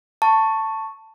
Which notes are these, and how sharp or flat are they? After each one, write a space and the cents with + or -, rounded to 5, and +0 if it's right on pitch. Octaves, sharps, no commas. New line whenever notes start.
A5 +10 C#6 +0